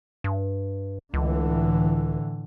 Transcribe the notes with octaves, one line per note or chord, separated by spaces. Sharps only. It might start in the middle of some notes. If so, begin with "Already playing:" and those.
G2
C#2 A2 D3 E3